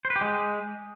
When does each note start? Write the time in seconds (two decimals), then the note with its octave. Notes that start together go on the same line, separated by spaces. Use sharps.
0.05 C5
0.10 B4
0.16 G4
0.21 G#3